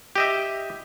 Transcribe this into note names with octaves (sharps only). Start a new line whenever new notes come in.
G4 D#5 E5